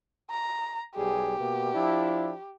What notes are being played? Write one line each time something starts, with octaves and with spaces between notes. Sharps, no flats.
A#5
B1 G3 G4 G#4
B2 A#3
F3 D4 E4